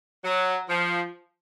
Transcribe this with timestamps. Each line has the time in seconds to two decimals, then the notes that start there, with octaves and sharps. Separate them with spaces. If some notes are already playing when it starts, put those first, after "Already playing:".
0.24 F#3
0.69 F3